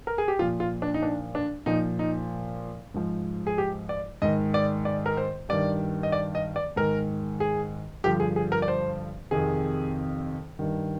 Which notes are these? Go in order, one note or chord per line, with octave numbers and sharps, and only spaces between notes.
A#4
G#4
G4
A#2 F3 F4
F4
D4
D#4
D4
D4
A#2 F3 D#4
D#4
G#2 F3
G#4
G4
D5
G#2 D#3 D#5
D5
D5
A#4
C5
G2 D#3 D5
D#5
D5
D#5
D5
G#2 D#3 A#4
G#4
G2 D3 F3 G4
G#4
G#4
A#4
D5
C5
F2 C3 D#3 G#4
G2 D#3